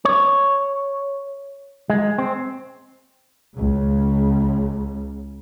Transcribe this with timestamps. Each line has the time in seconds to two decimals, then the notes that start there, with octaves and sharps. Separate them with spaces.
0.05 C#5
1.90 G#3
2.18 C4
3.57 C#2 C#3